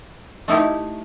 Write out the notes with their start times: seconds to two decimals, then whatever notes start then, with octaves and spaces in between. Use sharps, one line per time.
0.48 A3 D#4 E4 G4